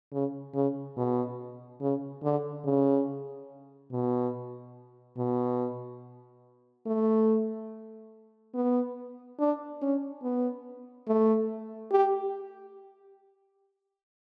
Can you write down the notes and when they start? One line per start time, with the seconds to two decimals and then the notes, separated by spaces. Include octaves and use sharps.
0.12 C#3
0.54 C#3
0.97 B2
1.81 C#3
2.23 D3
2.65 C#3
3.91 B2
5.17 B2
6.87 A3
8.55 B3
9.40 D4
9.82 C#4
10.23 B3
11.08 A3
11.92 G4